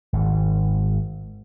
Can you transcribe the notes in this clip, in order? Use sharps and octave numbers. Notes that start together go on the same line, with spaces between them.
G#1